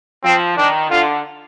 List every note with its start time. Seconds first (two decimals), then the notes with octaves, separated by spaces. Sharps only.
0.24 F3 C4
0.57 D#3 D4
0.90 D3 F4